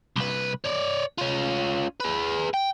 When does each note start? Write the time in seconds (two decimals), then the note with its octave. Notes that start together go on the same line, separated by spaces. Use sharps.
0.16 C2 B4
0.65 C#5 D5
1.18 C#4 F4
2.00 G#4 B4
2.54 G5